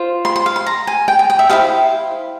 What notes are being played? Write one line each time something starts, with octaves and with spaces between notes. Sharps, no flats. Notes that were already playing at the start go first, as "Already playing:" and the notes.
Already playing: F4 C5
C6
C6
F5
C6
A#5
G#5
G5
G5
G5
E5
E4 G#4 C5 F5